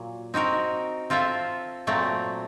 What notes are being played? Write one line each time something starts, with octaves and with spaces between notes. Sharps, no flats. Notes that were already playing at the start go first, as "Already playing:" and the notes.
Already playing: A#2 F#3
C4 D#4 F#4 A#4
C4 F4 A4 C5 E5
A#2 F#3 A3 C4